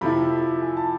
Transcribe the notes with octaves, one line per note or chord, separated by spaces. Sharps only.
F2 C3 F3 A3 E4 B5
G#5
A5